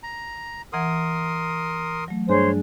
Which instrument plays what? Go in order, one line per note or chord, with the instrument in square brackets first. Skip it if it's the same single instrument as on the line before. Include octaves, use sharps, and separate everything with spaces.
[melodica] A#5
[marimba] E3 F#5 [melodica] A#4 C6 D#6
[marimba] F#3 A3
[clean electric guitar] G2 D4 [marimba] G#4 G#5 [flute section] C5 C#5